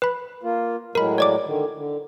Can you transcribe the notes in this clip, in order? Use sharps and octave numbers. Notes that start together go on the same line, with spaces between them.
B4 B5
A#3 F4
A2 F#3 G#3 A#4 B5
C#5 D5 D6
D3 D#3
D3